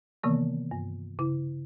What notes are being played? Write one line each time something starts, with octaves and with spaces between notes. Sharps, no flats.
C3 D#3 E3 A#3 B3
G2
C#3 E4